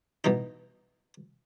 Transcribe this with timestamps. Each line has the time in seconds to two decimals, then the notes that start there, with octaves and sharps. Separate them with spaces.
0.24 B2 E3 D#4